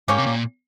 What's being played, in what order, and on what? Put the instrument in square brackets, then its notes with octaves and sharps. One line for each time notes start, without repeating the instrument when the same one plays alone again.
[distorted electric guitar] G#2 [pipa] A#3 C#4 G4
[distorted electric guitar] C3
A#2